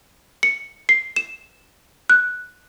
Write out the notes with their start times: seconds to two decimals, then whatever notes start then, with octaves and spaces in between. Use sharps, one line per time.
0.43 C#7
0.89 C7
1.16 E7
2.10 F#6